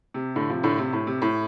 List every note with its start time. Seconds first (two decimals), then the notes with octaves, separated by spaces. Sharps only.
0.14 C3
0.36 A2 D3
0.50 C3 F3
0.63 A2 D3
0.78 C3
0.93 A2
1.07 C3
1.22 A2